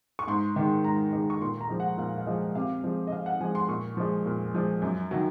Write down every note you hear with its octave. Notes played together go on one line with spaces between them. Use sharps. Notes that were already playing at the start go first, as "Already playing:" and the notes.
C#6
G#2 C6
D#3 G#3
G#2 A#5
D#3 G#3
C#6
A#2 C6
A#5
F3 G#3
F#5
A#2 F5
F5
F3 G#3 D#5
C3 F5
F3 G#3
D#5
C3 F5
F#5
F3 G#3 G#5
C6
A#2 C#6
F3 G#3
A#2
F3 G#3
F#2
D#3 F#3